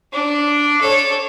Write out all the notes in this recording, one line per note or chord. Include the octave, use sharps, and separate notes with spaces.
D4
A4 C#5